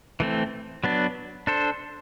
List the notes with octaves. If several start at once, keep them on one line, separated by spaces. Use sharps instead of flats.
E3 A3 C4
F#3 B3 D4
D4 A4 C5